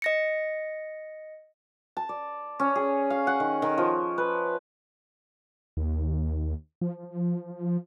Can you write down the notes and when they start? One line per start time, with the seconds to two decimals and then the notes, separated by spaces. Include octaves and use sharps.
0.02 D#5 A#6 C#7
1.97 A5
2.09 D5
2.59 C#4
2.75 G#4
3.10 F5
3.27 F#5
3.40 D#3
3.62 D#3
3.78 F3
4.18 B4
5.77 D#2
6.81 F3